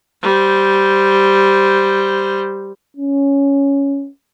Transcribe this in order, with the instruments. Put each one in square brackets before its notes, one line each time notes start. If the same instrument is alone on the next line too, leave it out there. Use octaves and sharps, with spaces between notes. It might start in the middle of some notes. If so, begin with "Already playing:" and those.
[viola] G3 C5
[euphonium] C#4